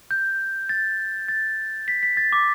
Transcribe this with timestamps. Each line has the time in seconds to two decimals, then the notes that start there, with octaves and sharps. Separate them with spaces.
0.11 G6
0.69 A6
1.28 A6
1.88 B6
2.03 B6
2.17 A6
2.33 D6